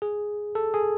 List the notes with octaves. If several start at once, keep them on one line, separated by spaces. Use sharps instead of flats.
G#4
A4
G#4